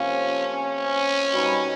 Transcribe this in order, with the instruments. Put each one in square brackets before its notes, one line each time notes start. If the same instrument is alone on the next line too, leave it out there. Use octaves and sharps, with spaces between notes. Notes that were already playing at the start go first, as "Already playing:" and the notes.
Already playing: [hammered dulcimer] C3 F3 A#3 [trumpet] C#4
[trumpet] C#4
[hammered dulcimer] B2 G3 B3 D#4